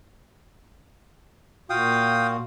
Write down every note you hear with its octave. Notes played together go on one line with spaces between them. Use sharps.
A#2 F4 F#4 F5 G5 D#6